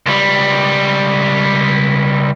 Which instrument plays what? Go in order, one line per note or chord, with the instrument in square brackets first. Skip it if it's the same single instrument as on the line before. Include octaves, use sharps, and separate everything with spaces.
[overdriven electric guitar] C#2 G3